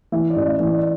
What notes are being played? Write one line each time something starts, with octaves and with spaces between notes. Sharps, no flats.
E3 E5
D5
A1
E5
E3
D5